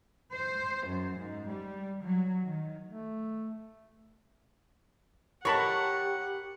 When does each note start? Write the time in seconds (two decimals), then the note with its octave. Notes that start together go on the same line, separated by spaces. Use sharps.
0.34 C5
0.87 F#2
1.19 G#2
1.51 G3
2.03 F#3
2.45 D#3
2.87 A3
5.45 G4 A#4 C#5 F#5 A5 B5 C#6